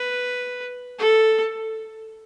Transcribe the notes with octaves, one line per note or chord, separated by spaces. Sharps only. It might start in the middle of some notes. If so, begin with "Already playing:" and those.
Already playing: B4
A4